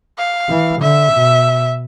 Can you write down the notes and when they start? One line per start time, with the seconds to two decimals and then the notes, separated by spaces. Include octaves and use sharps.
0.18 F5
0.49 E3
0.81 D3 E5
1.12 B2